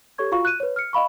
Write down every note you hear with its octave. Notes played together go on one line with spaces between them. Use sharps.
G4 A4 C#5 C#6 G#6
F4 F#4 F5 C#6
F#6 D#7
B4 C#5
F6 C#7
D#5 F5 B5 C#6